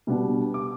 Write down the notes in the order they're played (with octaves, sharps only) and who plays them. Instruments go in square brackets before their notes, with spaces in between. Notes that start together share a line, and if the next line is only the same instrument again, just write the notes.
[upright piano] B2 G3 B3 D4
D6